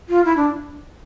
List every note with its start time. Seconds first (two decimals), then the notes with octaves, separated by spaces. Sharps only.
0.09 F4
0.25 E4
0.36 D4